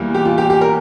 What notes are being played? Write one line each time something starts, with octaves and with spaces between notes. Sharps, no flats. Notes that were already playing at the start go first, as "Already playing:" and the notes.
Already playing: E2 E3 G3 A#3
G4
F4
G4
G4
A#4